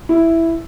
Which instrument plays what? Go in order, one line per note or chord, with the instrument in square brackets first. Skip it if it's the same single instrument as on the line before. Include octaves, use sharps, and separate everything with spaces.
[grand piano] E4